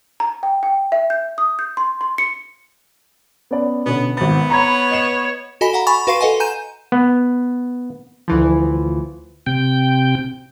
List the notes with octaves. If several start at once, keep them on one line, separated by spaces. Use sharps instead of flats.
A#5
G5
G5
E5
G6
D#6
G6
C6
C6
C#7
B3 C#4 D5
B2 D3 B3 C#4
G#1 B3 A6
C#5 A#5 B5 G#6
D#5 E7
F#4 A4 D#5 G#5 B5 B6
F5 F#5 A#5
G#5 B5 C#6 A6 F7
F#4 B4 F5 C6 C7 D#7
A4 B4 D#5 F#5 G#5
G#5 A#5 G6 D#7 E7
B3
D2 E3 F3
C3 G5